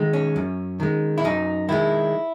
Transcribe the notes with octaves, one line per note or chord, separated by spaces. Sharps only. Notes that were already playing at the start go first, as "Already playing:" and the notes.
Already playing: D#3 G#3
C#4
F#2
D#3 G#3
E4
F#2 D#4
D#3 G#3 E4